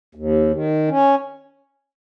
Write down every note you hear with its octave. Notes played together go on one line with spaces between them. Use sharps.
D#2
D#3
C#4